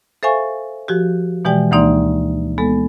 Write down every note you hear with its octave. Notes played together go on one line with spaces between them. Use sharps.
A4 C5 E5 F5 G#5 C#6
F3 F#4 G4
B2 E3 G#3 G4 D5 G5
D2 E3 A#3 D#4 D5 C6
G#3 B3 A4